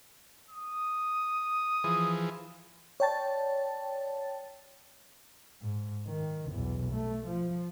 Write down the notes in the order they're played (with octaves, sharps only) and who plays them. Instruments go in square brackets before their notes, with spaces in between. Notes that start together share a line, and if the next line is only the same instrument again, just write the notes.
[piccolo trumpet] D#6
[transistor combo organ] E3 F3 G#4
[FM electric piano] C#5 D5 G5 A5 A6
[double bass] G#2
D#3
B1 E2
A3
F3